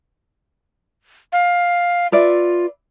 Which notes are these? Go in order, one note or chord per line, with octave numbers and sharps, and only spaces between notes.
F5
F4 B4 D5 E5